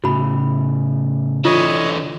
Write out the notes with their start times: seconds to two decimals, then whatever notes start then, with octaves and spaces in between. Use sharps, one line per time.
0.04 A2 C#3 F#4 B5
1.45 D3 E3 F4 C#5 D#5